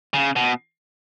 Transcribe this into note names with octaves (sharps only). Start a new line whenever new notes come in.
C#3
B2